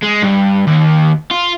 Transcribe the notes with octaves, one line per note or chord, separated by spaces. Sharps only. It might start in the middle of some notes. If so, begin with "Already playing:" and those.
G#3
G2
D#2
F4